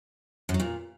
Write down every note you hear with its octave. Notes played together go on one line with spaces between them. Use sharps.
F#2
F#3
A#2